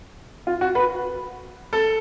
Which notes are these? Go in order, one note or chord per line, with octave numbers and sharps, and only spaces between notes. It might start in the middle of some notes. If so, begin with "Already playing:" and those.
F4
F#4
B4
A4